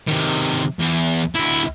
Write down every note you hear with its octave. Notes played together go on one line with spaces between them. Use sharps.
C3 D#3
E2
D2 E4